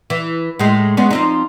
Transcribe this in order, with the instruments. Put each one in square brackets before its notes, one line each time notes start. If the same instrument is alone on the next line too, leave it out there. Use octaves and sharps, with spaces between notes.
[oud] E3
A2 G#3
G#3 B3 C#4
F3 C4 D#4